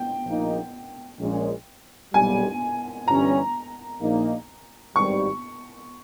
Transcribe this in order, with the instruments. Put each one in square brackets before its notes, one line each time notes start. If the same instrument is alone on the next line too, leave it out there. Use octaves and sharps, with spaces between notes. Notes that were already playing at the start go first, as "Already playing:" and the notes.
Already playing: [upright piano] G5
[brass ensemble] A#1 A#2 A#3 D#4
A#1 A#2 G#3 C#4
[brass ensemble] B1 A#2 G3 [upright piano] G#5
[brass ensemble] G1 G2 E3 G3 C#4 [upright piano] A#5
[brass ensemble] A#1 A#2 A#3 D#4
[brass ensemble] G#1 G2 G3 [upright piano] C#6